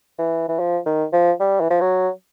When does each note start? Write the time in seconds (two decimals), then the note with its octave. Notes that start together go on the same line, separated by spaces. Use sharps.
0.18 E3
0.48 E3
0.59 F3
0.86 D#3
1.13 F3
1.40 G3
1.60 E3
1.70 F3
1.81 F#3